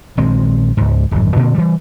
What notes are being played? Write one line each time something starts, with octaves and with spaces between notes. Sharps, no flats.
A#1 D#3 G#3 C4
C#2 G#2
D1 G#1 F#2
A#2 D3 A#3 C4
E3 G3